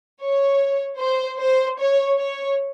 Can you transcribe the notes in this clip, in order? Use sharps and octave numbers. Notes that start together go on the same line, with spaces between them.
C#5
C5
C5
C#5
C#5